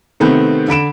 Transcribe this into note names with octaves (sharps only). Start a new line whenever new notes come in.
C3 D#3 A3 B3 C4
D3 B5 D7 E7